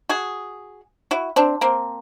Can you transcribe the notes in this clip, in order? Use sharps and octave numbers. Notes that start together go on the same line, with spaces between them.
F#4 G#4
E4 F#4
C4 D4
A#3 C4